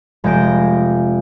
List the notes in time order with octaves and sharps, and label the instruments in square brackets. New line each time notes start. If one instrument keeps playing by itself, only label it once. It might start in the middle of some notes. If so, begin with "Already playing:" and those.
[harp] F1 G#3 G6 A#6 D7